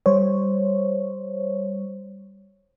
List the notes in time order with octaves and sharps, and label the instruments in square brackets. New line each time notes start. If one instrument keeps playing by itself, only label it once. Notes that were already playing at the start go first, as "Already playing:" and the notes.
[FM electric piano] G3 C5 C#5